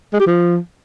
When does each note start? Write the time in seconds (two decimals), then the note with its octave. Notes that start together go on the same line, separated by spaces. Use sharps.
0.13 G#3
0.20 G4
0.27 F3